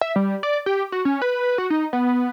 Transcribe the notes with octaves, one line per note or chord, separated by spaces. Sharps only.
E5
G3
D5
G4
F#4
C#4
B4
F#4
D#4
B3